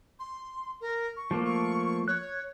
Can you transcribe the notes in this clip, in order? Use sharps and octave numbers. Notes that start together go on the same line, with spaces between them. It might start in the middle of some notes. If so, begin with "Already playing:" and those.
C6
A#4
C#6
F3 A3 A#3
C#6
C#5 F#6